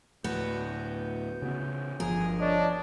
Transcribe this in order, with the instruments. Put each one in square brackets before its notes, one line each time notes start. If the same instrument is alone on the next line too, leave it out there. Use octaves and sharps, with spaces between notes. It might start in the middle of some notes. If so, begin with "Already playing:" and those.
[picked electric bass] D2 A2 [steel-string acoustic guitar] B3 F#4 B4 [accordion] G6
[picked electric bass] C#3 B3
[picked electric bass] G1 F3 [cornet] G#4 [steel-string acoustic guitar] A#4
[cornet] D4 [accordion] C#5 D#5 A5